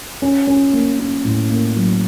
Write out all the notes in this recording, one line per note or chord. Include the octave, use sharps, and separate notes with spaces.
C#4
C#4
A#3
C#4
A2
A#3
F#3